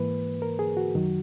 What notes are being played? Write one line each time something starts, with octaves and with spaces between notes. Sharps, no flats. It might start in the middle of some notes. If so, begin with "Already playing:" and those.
Already playing: G#2 E3 A#3 B4
A#4
G#4
F#4
F#2 D#3 F#3